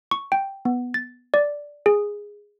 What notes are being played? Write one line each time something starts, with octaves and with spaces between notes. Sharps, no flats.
C#6
G5
B3
A6
D5
G#4